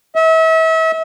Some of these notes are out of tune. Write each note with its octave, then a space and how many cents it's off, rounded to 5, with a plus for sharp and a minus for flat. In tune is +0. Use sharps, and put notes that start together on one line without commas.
E5 -35